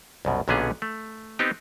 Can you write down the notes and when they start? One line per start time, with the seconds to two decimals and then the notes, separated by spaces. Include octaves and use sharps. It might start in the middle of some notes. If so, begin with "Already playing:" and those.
0.25 C2 F#2 B2
0.48 B1 A#2 D3 B3 C#4 G#4
0.82 A3
1.39 B3 C4 D#4 G4